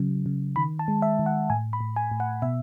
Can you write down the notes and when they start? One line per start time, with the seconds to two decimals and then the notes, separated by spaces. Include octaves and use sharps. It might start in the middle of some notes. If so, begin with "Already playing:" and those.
Already playing: C#3 F#3
0.26 C#3
0.56 D#3 B5
0.79 A5
0.88 G#3
1.02 E5
1.19 D#3
1.26 F#5
1.50 A2 G#5
1.73 B5
1.81 A2
1.96 G#5
2.11 A2
2.20 F#5
2.42 B2 E5